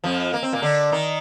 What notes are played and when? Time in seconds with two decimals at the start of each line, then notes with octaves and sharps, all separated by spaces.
0.04 F2 F3
0.34 A#3
0.43 C4
0.53 A#2 A#3
0.62 D3 D4
0.92 D#3 D#4